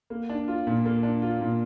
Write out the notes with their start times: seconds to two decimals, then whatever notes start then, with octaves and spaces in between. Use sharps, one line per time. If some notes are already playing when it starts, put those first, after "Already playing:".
0.10 A#3
0.29 D4
0.48 F4
0.67 A#2
0.85 A#3
1.03 D4
1.22 F4
1.41 A#2